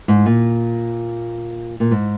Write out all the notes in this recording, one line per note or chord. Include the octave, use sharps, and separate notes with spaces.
G#2
A#2
A#2
G#2